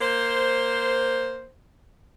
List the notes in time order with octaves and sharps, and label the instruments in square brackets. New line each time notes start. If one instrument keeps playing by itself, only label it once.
[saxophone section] A#3 C5